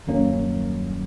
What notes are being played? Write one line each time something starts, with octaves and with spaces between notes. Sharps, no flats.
D#1 F#2 A#3 C#4